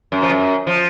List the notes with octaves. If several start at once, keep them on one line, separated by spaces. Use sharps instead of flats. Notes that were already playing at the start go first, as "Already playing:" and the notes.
F#2
F3
F#2
F3